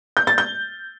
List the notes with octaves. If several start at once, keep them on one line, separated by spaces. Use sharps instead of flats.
G6
A6
G6